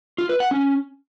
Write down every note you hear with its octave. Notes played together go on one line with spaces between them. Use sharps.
F4
B4
F#5
C#4